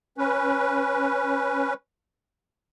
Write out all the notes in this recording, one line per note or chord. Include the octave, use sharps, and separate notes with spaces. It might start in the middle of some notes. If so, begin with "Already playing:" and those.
C#4 B4